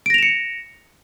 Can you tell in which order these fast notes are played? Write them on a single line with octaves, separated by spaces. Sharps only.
D7 A#6 F7 E7 C#7